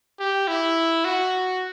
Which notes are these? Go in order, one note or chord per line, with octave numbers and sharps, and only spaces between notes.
G4
E4
F#4